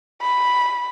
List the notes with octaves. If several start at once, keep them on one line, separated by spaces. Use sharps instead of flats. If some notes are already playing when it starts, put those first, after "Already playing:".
B5